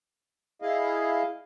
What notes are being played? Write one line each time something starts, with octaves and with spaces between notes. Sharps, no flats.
E4 G#4 D#5 F5